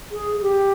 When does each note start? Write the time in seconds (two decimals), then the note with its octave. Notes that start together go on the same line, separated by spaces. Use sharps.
0.12 G#4
0.42 G4